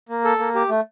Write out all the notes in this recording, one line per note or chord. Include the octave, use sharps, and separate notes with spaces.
A#3
A4
A#3
G4
A3